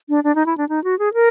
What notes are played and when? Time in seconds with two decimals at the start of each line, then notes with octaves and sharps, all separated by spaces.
0.09 D4
0.24 D4
0.35 D#4
0.46 E4
0.58 D4
0.69 D#4
0.84 F#4
0.99 G#4
1.14 A#4